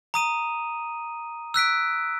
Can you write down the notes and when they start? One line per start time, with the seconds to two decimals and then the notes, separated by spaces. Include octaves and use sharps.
0.14 A#5 D#6 D#7
1.54 E6 F#6 B6 D7